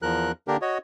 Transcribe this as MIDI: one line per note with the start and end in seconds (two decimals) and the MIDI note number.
0.02 0.32 40
0.02 0.32 53
0.02 0.32 70
0.02 0.32 90
0.48 0.57 50
0.48 0.57 58
0.48 0.57 62
0.48 0.57 67
0.48 0.57 70
0.62 0.78 66
0.62 0.78 73
0.62 0.78 75